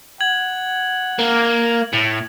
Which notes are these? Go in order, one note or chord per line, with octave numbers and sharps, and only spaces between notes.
F#5 G#6 F#7
A#3
A2